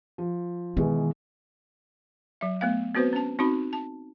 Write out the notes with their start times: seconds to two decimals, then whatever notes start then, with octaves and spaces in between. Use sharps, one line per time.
0.18 F3
0.77 B2 D#3 E3 G#3
2.41 F#3 E5
2.61 A3 B3 F5
2.95 B3 C4 F#4 B4 C5
3.13 C#4 A5
3.39 C4 D#4 F#4 B5
3.73 A5